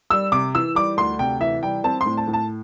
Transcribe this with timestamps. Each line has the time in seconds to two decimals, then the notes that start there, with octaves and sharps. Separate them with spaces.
0.10 G3 E6
0.32 C3 D6
0.55 E3 E6
0.75 G3 D6
0.97 D2 C6
1.19 C3 G5
1.40 E3 E5
1.63 G3 G5
1.84 C4 A5
2.01 C6
2.06 A2
2.17 A5
2.28 A2
2.33 A5